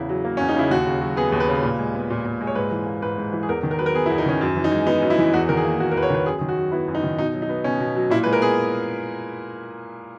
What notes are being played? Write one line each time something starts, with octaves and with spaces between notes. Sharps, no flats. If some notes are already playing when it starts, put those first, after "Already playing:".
Already playing: E2 C#3 E4
F#3
A#3
E2 C#4
D#4
C#3 E4
D#2 F#4
C#3
F#3
B3 G#4
D#2
B4
C#3
A#2
G#3
B3
A#2
A#2
G#3
C#5
G#2 B4
E3
A#3
G#2 B4
G#2
E3
G#4
E2 A#4
D#3
A#4
F#3 B4
A#4
B3 G#4
E4
E2
D#4
D#3 C#4
F#2
E3
D#4
G#3
B3 D#4
F#2
E4
E3
E2 F#4
D#3 A#4
G#4
A#3
E2 F#4
A#4
E2 B4
C#5
D#3 B4
F#2 G#4
D#3 G#4
F#4
F#3
B3 E4
F#2
D#4
D#3
B2 D#4
F#3
D#4
B3
B2 C#4
B2
F#3
A#2 E4
G#3 B4
A#4
B3 G#4